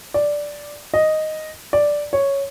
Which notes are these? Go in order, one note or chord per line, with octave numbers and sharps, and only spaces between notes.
D5
D#5
D5
C#5